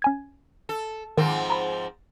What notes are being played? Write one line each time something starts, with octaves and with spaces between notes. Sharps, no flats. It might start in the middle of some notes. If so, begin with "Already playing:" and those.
C#4 G#5 G#6
A4
G#2 D#3 F3 C4
A#5 B5